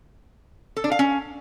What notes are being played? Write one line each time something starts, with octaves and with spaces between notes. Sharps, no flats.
A4
D4
F5
C#4